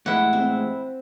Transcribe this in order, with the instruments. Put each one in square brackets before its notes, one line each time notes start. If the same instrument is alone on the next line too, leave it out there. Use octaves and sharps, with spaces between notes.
[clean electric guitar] A2 E3 G#3 [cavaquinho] E4 F#5
[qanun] C4